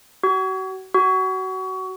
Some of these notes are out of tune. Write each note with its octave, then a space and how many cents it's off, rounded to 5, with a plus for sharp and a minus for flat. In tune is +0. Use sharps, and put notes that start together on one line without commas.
F#4 +35
F#4 +25